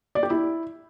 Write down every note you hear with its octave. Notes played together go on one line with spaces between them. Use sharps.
D5
G4
E4